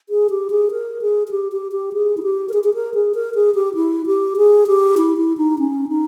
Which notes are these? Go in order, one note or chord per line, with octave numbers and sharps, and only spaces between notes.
G#4
G4
G#4
A#4
G#4
G#4
G4
G4
G4
G#4
E4
G4
A#4
G#4
G#4
A#4
G#4
A#4
G#4
G4
E4
G4
G#4
G4
E4
E4
D#4
C#4
D#4